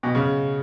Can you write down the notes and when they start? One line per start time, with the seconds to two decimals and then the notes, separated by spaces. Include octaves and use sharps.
0.03 B2
0.15 C#3